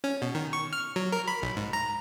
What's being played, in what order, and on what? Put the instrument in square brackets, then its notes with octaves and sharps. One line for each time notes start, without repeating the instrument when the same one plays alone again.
[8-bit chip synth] C#4
B2
D#3
C#6
F6
F#3
A#4
B5
B1
G#2
A#5